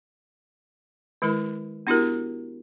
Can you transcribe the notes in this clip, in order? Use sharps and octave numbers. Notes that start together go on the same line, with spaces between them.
D#3 G#3 E4 A#4 B5
B3 D4 E4 F#4 G4 A#4